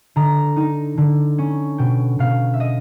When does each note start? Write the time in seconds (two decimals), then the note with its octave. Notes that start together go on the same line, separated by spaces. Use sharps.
0.16 D3 A#5
0.56 D#4
0.98 D3
1.38 C#4
1.78 B2 G5
2.19 B2 F5
2.54 E5
2.60 D#5